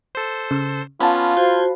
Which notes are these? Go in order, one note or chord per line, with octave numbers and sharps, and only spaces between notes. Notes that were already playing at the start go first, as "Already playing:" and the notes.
A4 C5
C#3
B3 C#4 F4 F5 A5 B5
F#4 C5 G6 G#6